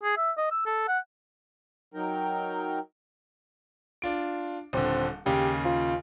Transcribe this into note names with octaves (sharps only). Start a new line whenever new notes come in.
G#4
E5
D#5
E6
A4
F#5
F#3 D#4 A#4 G5 A#5
D4 F4 D7
D#1 D3 C4
D#2 C#3 G4
F4